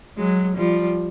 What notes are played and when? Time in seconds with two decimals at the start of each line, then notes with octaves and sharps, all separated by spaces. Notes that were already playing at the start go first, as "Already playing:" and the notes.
0.17 F#3 G#3
0.57 F3 G3